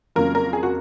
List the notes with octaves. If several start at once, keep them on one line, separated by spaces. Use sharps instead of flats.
F2 C#3 F#3 A#3 A#4
A#4
G#4
F#4